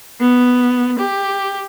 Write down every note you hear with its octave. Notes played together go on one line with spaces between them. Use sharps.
B3
G4